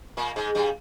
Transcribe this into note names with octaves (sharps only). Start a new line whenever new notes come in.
A#2 A#3
G#2 G#3
G2 G3